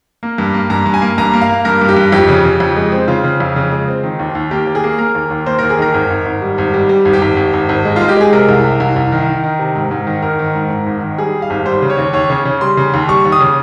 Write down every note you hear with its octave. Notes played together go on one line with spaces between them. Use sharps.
A#3
G2
A#3
G2 A#5
G2
G#5
A#3
G2 A#5
A#3
F5
A#3
G2 A#4
G2
G4
G2
F2 G4
C#3
C#3
F2
G#3
C4
C#3 F4
C#3
F2
C#3
G#3
C4
D#3
D#2
D#2
A#3 G4
D#2
G#4
A#3
A#3 A#4
D#2
D#2
A#3 C5
D#2 A#4
G#4
D#3 A#4
G#1
G#1
G#1
G3
G#1
G3
G3
G#1
G4
G#1
G#1
G#1
G#1
G#3
G#3 F4
G4
G#3 G#4
C3 A#4
C2
C3
C2
C2
D#3
D#3
D#3
C3
G#2
G#2
D#3
G#1 A#4
D#3
G#2
G#2
G#1
D#3
G3 G#4
G3
F5
G#1
G3 C5
C#3
C#5
D#2
D#2 C#5
C#3
C#3
G3 C6
C#3
D#2
G3 C#6
D#2
D#6
C#3